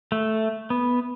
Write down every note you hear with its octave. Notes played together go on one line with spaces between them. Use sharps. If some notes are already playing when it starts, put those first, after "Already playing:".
A3
B3